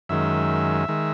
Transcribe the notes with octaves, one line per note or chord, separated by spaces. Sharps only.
F#2 D#3 G#3 E5
D#3 G#3